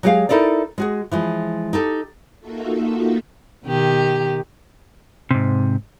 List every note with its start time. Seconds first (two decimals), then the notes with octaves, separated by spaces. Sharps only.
0.03 F#3 G#3 G4 G#4 F5
0.29 D#4 E4 A4 A#4 D5
0.78 G#3 F#4 G#4
1.11 E3 F3 G#3
1.73 D#4 G4 A4
2.39 A#3 D#4 F4 F#4 A4 E5
3.64 B2 D#3 G4
5.31 G#2 C3